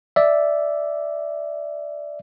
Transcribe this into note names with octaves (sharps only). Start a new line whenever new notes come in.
D5 E5